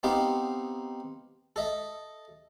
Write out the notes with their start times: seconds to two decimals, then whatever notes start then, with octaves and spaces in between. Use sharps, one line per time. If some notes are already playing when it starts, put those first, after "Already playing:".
0.03 B3 C4 D#4 G4 F5 G5
1.56 A4 D#5 E5